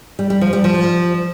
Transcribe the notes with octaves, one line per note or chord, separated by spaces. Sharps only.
G3
G3
F3
G3
F3